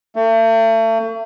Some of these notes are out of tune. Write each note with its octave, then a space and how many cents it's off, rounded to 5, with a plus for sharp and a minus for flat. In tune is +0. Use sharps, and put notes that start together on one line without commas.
A3 +40